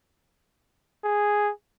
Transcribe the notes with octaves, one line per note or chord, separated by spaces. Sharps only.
G#4